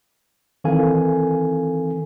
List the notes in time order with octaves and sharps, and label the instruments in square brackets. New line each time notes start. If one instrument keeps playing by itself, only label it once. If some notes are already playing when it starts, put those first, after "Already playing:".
[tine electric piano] D#3 E3 C4 A4 F5 G#5